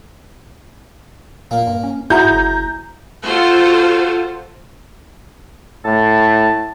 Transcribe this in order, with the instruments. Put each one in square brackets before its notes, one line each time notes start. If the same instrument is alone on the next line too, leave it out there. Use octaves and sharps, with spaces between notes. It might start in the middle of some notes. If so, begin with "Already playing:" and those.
[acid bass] A#2 [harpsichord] A#3
[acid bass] G2
C#4
[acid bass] G#2 [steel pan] E4 F#4 [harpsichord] G#4 [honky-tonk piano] A#5 G6
[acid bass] F#1
[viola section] F4 F#4 A4 C5
[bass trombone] A2 [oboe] A5